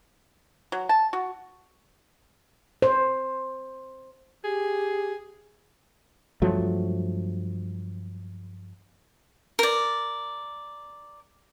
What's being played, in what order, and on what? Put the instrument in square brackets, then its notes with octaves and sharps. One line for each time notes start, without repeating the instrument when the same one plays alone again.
[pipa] F#3
A5
F#4
[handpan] C5
[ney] G4 [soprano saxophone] G#4
[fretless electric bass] G2 F3 F#3 A3
[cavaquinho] A#4 D5